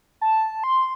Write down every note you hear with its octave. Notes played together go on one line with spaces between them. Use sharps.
A5
C6